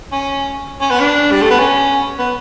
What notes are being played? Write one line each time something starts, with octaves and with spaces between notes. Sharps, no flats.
C#4
C#4
B3
D4
G3
A3
B3
C#4
B3